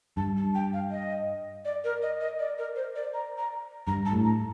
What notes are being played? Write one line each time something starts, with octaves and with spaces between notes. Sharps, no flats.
G2 A5
A5
G5
F5
D#5
D5
A#4
D#5
D#5
D5
A#4
C5
D5
A#5
A#5
G2 A#5
A5
A2
A#5